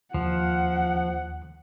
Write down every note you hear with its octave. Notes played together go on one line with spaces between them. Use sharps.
D#2 F3 F#5